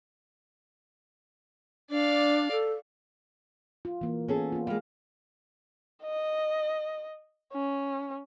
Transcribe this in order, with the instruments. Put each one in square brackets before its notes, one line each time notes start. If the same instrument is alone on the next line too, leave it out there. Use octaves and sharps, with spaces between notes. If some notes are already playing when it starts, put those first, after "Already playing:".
[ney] D4 [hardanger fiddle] D5 F5
[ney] A4
[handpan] F4
E3 A#3
[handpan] B3 [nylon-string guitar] C#4 G#4 A4
[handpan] A#3 F4
[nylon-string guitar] G3 G#3 [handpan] F5
[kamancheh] D#5
C#4